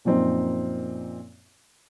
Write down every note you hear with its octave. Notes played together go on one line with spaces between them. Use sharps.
F#2 A#2 F3 C4 D#4